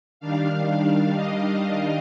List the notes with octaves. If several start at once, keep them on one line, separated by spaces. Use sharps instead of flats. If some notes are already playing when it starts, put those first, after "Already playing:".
D#3 G3 D4 F5
F5
D#5
D#5